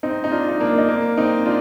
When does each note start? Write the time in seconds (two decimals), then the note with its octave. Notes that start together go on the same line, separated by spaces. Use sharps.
0.03 C4 D#4
0.24 D#4
0.31 D4 F4
0.49 D#4
0.60 A#3 D4
0.78 D#4
0.89 A#3 D4
1.17 C4 D#4
1.45 D4 F4